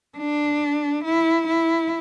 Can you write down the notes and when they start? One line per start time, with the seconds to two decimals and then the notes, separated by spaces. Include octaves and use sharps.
0.17 D4
1.04 E4
1.47 E4